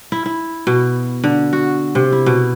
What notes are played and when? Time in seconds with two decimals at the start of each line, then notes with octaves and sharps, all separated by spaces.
0.12 E4
0.26 E4
0.67 B2
1.24 D3
1.53 F#4
1.95 C3
2.12 E4
2.26 B2